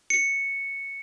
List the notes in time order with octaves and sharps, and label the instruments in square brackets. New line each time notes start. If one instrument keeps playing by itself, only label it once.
[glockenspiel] C#7